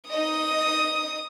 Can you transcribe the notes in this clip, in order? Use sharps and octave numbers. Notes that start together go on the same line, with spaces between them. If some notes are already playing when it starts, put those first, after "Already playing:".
D#4 D#5 D#6